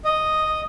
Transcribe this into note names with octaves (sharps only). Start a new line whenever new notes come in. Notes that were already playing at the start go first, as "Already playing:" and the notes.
D#5